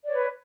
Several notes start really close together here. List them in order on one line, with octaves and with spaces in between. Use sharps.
D5 C#5 B4